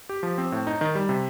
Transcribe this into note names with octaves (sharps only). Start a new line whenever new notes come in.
G4
F3
C4
A2
D#4
D#3
G3
C3